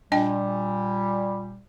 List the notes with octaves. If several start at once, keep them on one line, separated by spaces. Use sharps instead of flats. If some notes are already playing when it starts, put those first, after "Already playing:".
A#2 G3 D4 D#5 G5